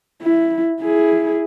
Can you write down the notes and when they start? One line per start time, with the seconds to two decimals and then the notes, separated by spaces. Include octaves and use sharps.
0.22 E4
0.80 E4 G#4